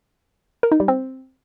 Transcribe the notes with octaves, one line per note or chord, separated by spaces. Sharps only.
A#4
D#4
G3
C4